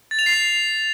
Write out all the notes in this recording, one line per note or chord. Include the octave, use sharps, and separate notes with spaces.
A6
F7
C7